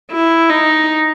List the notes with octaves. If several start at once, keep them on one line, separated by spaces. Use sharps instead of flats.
E4
D#4